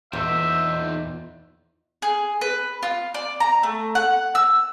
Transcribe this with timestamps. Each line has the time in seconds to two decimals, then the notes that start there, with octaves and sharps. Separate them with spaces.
0.13 E2 A#2 D#4 C5 E5
2.02 G#4
2.41 B4
2.83 F4
3.14 D5
3.40 A#5
3.63 A3
3.95 F#5
4.35 E6